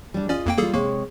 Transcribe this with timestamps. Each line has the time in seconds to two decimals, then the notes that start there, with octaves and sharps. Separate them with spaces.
0.14 G3 D4
0.29 C#4 F4 D5 D#5
0.46 F2 A#3 G5
0.58 G3 A#3 F4 G#4 A4
0.74 C3 G#3 A#3 C#5